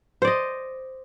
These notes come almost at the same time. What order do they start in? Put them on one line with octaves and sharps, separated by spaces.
C5 D5 D#5